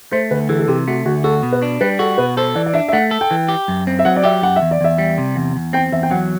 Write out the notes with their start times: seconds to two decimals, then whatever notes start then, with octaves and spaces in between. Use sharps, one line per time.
0.12 A3 C5
0.31 D2 B4
0.49 E3 A4
0.59 A4
0.68 C3 G4
0.88 A3 F#4
1.06 D2 F#4
1.24 F#4 A4
1.43 B2
1.52 B4
1.62 D4
1.81 G3 B4
1.99 F#4 A4
2.18 B2 B4
2.37 A4 C5
2.55 E3 D5
2.66 D5
2.74 D4 E5
2.88 E5
2.93 A3 F#5
3.11 A4
3.21 G5
3.31 E3
3.49 G4
3.68 F#2
3.87 C4
3.99 E5
4.05 F#3 F#5
4.16 D5
4.23 G4 E5
4.42 F#2 F#5
4.56 E5
4.62 E2
4.71 D5
4.81 E2 E5
4.98 G3
5.18 C3
5.36 E2
5.56 E2
5.73 C4 G5
5.92 E2 E5
6.03 G5
6.11 F#3 F#5